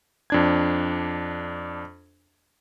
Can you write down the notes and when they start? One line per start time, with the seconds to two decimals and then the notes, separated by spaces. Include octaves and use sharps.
0.30 F2 D4 G#6